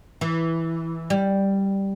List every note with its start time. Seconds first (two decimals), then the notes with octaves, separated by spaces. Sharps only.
0.21 E3
1.10 G3